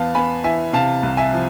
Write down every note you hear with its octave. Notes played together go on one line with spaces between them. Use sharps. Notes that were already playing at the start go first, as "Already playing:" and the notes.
Already playing: E2 B3 F5 A5
B3 G#5 B5
E3 E5 G#5
C3 F5 A5
C2
E5 G#5
F3